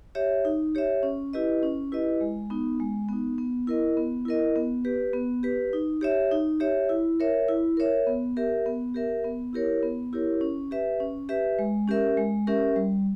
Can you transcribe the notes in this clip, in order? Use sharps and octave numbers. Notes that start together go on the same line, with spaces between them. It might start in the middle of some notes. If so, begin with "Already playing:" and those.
G4 C#5 E5
D#4
G4 C#5 E5
C#4
E4 G4 B4 D#5
C#4
E4 G4 B4 D#5
G#3
B3 D#4
G#3
B3 D#4
B3
E4 A#4 D#5
B3
E4 A#4 D#5
B3
G4 B4
B3
G4 B4
D#4
G4 C#5 E5
D#4
G4 C#5 E5
E4
A#4 C#5 E5
E4
A#4 C#5 E5
B3
G4 A#4 E5
B3
G4 A#4 E5
B3
E4 G4 A#4 C#5
B3
E4 G4 A#4 C#5
C#4
G4 B4 E5
C#4
G4 B4 E5
G#3
C#4 G4 A#4 E5
G#3
C#4 G4 A#4 E5
G3